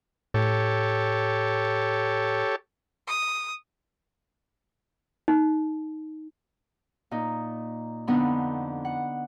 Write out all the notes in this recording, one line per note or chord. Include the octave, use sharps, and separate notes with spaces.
A2 G4 A4 C#5
D#6
D#4
A#2 D#4
F2 D3 B3 D4 D#4 B5
F#5